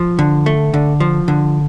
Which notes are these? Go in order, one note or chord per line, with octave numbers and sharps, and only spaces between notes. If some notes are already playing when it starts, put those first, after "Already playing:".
Already playing: F3
D3
A3
D3
F3
D3